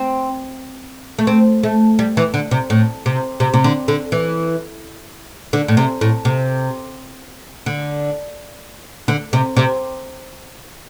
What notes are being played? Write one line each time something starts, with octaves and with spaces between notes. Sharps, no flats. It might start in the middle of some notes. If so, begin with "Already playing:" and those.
Already playing: C4
A3
C4
A3
G3
E3
D3
C3
A2
C3
C3
C3
D3
D3
E3
D3
A2
C3
A2
C3
D3
D3
C3
C3